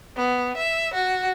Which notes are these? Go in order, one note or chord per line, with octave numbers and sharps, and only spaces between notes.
B3
E5
F#4